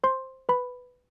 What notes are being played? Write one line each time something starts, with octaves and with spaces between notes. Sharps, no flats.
C5 C6
B4 B5